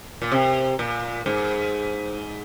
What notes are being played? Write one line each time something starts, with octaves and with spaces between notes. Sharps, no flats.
A#2
C3
A#2
G#2